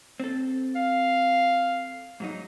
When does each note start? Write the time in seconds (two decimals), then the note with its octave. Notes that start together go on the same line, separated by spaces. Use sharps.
0.20 C4 A4
0.76 F5
2.20 G#2 F#3 D#4